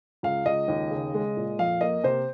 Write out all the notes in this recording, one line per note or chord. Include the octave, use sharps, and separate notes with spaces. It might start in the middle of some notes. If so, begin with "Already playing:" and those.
C#2 F5
C#2 D#5
D#2
C#3
G#3
A#2
F2 F5
A#3 D#5
C3 C5